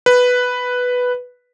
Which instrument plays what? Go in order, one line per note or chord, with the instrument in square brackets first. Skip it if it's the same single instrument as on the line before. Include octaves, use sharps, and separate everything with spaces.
[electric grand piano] B4